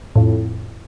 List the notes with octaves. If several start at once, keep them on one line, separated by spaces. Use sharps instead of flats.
F2 A2